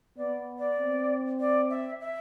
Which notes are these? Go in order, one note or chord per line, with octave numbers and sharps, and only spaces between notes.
B3 D5
D5
C4
D5
E5
E5